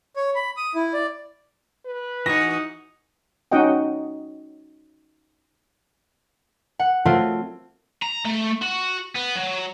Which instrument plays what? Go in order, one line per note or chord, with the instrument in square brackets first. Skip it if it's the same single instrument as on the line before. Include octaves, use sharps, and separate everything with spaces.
[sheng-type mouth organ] C#5
B5
D#6
E4
D5
[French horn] B4
[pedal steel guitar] E3 F#4 G#5 [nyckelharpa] D#4 F#5 [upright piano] A#6
[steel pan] C#4 D#4 F#4 D#5 F#5 G5
[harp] F#5
F#3 A3 C4 F4
[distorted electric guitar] A#5
A3
F#4
B3
F#3